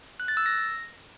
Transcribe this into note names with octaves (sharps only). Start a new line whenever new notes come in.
F#6
A6
E6
A#6